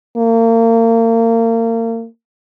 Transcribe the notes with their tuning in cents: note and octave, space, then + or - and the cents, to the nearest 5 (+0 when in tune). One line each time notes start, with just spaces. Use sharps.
A#3 -35